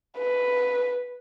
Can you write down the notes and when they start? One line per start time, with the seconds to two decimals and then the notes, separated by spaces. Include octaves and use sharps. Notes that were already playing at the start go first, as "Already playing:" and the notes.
0.18 B4